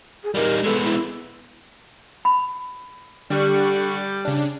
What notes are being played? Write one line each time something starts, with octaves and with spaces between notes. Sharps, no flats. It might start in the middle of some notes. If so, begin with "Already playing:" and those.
G#4
G3 D#4 A#4
G#3 B3 A4
E4
B5
D3 G3 C#6 F#6
C#3 D4